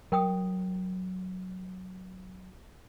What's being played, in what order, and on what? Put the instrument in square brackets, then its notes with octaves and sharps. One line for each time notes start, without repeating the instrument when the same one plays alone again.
[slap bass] F#3 [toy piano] A#4 G5 D#6